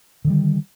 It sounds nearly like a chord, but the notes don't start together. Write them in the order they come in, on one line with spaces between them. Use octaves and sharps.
D3 D#3 G3